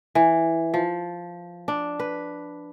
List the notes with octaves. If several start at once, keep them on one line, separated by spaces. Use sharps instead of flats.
E3
F3
D4
B4